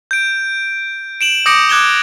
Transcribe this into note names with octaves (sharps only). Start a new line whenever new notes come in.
G6 D7
D7 E7 F#7
D6 D#6 G6 A#6 C#7 D7
D6 F#6 G#6 E7 G7